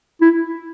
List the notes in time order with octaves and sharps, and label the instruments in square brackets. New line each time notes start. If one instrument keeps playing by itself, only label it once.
[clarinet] E4